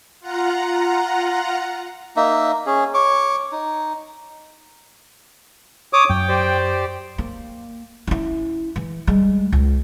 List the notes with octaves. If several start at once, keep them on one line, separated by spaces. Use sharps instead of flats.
F4 F#5 A#5
A#3 D#4 E5
C#4 G#4
C#5 C#6 D6
D#4
C#5 D6 D#6
F#2 G5
G4 C5 D5
A#3
C#4 E4
E3
G3 G#3
C#2